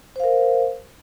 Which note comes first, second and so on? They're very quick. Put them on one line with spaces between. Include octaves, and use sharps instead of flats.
C5 F5 A#4